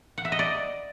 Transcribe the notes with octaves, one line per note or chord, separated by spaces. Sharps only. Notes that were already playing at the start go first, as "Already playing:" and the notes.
F#5
E5
D#5
D5